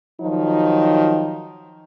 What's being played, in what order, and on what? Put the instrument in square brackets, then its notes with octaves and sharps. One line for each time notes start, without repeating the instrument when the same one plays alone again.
[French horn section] D#3 F3 F#3 D#4